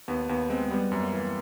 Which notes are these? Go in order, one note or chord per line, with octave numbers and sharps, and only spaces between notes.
D#2 B3
D#2 B3
G#3 C4
G3 B3
F#2
A#3
E3